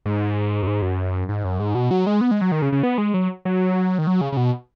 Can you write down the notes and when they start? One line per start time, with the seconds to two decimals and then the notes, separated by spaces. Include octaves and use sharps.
0.06 G#2
0.63 F#2
0.67 G#2
0.82 F#2
1.29 G#2
1.44 F#2
1.60 G#2
1.75 B2
1.91 F#3
2.07 G#3
2.21 B3
2.31 G#3
2.41 F#3
2.52 D#3
2.62 C#3
2.72 C#3
2.83 B3
2.98 G#3
3.14 F#3
3.45 F#3
3.98 D#3
4.07 F#3
4.21 C#3
4.32 C#3
4.37 B2